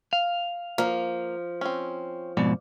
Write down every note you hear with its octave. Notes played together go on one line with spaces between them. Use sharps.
F5
F3 A#3
C4 C#4
F2 G#2 B2 D5